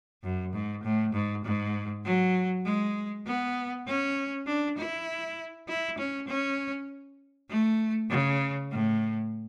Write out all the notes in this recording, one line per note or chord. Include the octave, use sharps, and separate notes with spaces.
F#2
G#2
A2
G#2
G#2
F#3
G#3
B3
C#4
D4
E4
E4
C#4
C#4
A3
C#3
A2